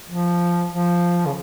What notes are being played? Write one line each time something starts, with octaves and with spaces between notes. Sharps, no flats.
F3
F3
C#3